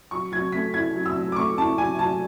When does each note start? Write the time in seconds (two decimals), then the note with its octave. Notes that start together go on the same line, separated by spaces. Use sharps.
0.11 F#3 C#6
0.32 F#3 G#6
0.52 A3 B6
0.74 E4 G#6
0.95 F#3
1.06 E6
1.16 F#3
1.32 D6
1.36 A3 C#6
1.58 E4 A5
1.78 F#3 G#5
1.99 F#3 A5